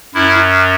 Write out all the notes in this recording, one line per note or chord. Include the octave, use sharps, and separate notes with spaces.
F#2 E4